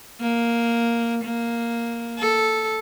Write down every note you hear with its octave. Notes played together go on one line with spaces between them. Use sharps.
A#3
A#3
A4